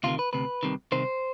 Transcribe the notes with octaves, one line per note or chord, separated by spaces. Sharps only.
D2 C3 D#3 F4
B4
D2 C3 B4
C2 C3 D#3
C2 C3 D#3 C5